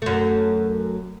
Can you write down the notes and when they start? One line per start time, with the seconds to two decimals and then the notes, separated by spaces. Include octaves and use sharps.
0.02 F#2 A3